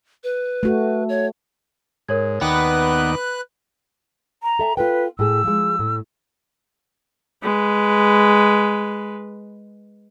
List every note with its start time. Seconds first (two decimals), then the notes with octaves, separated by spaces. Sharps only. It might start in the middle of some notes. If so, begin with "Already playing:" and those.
0.24 B4
0.63 A3 F#4
1.09 C#5
2.08 G#2 A#4 C#5 G#6
2.41 D#2 B3 D#4 B4 D5 G5 F#6
4.43 A#5
4.59 A4 E5 G#5
4.77 F4 A4 B4 G5
5.19 A2 G#4 E6
5.44 F3 G#3
5.79 A2
7.43 G#3 B4